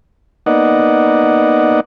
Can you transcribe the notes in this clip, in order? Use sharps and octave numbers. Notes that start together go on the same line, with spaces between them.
A#3 B3 D#4 D5 D#5 F#5